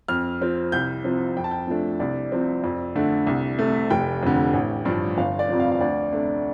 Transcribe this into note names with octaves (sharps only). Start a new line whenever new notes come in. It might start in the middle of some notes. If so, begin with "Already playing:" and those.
F2 F6
F3 C4
C2 G6
C3 F3 C4
F2 G5
A5
G5
F3 A3 D4
C2 D5
C3 F3 C4
F2
D3 A3 D4
C2
C3 A3
F1 G5
F2 D3
A1
G2 F3 D4
G1 F5
D5
F2 C3 F3
F5
F5
D2 D5
C3 A3 D4